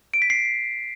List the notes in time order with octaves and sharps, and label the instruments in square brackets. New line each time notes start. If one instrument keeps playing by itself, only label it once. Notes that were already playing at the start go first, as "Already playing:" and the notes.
[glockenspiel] D7
B6
C7